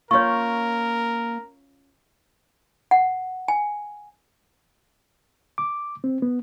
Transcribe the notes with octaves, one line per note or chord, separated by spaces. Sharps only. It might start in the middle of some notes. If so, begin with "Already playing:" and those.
A#3 C#4 F4 A#4 C#5 C#6
F#5
G#5
D6
C4
B3